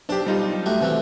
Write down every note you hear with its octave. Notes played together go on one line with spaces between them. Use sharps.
B1 D4 G4 C5 C6
G3 D#4 F4
A3 F#4 G4
C3 E3 F#4